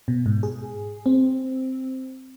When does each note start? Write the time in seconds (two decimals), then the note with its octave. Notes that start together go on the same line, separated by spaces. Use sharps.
0.08 B2
0.26 G#2
0.43 G#4
1.06 C4